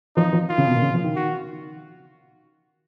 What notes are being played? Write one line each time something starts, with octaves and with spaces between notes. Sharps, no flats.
F3 D#4
F3
D#3 F4
C#3
B2
A#2
C#3
F3
D#3
F#4